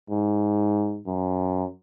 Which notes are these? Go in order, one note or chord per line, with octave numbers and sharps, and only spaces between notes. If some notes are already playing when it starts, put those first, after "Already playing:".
G#2
F#2